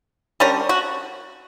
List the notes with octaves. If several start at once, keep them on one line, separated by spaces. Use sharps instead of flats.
D3 G3 C#4 A#4
F#4